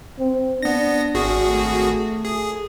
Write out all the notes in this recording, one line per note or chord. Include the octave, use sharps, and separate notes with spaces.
C4
B3 D4 A#6
G#1 F#4 G#4
A3
G#4